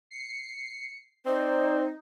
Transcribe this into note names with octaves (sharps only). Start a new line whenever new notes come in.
C7 C#7
C4 D#4 C5 D5